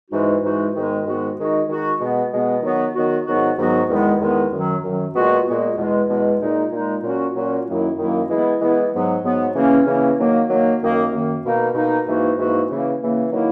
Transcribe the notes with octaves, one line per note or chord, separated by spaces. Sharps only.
G#2 E3 G#3 D#4 F#4
G#2 E3 G#3 D#4 F#4
G#2 D#3 G#3 B3 F#4
G#2 D#3 G#3 B3 F#4
D#3 G#3 D#4 F#4
D#3 G#3 D#4 F#4
B2 G#3 B3
B2 G#3 B3
D#3 F#3 B3 F#4
D#3 F#3 B3 F#4
G#2 D#3 F#3 B3 F#4
G#2 D#3 F#3 B3 F#4
E2 D#3 G#3 B3
E2 D#3 G#3 B3
F#2 D#3 F#3
F#2 D#3 F#3
A#2 G#3 B3 F#4
A#2 G#3 B3 F#4
E2 B2 G#3
E2 B2 G#3
A#2 G#3 D#4
A#2 G#3 D#4
A#2 F#3 C#4 F#4
A#2 F#3 C#4 F#4
F#2 D#3 F#3 A#3 E4
F#2 D#3 F#3 A#3 E4
E3 G#3 B3 E4
E3 G#3 B3 E4
G#2 F#3 B3
G#2 F#3 B3
C#3 E3 A#3 C#4
C#3 E3 A#3 C#4
D#3 F#3 A#3
D#3 F#3 A#3
F#2 D#3 A#3
F#2 D#3 A#3
B2 A#3 D#4
B2 A#3 D#4
G#2 E3 A#3 D#4 F#4
G#2 E3 A#3 D#4 F#4
C#3 E3 A#3
C#3 E3 A#3
D#3 F#3 A#3 E4